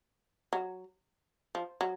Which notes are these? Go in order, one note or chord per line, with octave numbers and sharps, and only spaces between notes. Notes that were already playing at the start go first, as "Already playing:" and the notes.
F#3
F3
F#3